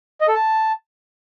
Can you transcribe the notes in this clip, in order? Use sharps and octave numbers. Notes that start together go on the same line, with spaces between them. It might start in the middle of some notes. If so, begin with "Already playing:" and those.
D#5
A4
A5